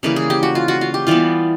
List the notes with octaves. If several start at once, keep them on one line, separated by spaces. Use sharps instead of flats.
C#3 E3 G3 A#3 B4
G#4
G4
F#4
F4
F#4
F4
G4
E3 G3 B3 F4